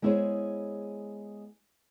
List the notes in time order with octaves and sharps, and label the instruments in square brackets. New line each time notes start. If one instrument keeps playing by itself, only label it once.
[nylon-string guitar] G#3 B3 E4 G#4 C5 C#5